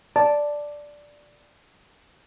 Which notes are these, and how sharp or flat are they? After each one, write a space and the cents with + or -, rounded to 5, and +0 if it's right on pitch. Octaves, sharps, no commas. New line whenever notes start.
D5 +0 A5 +0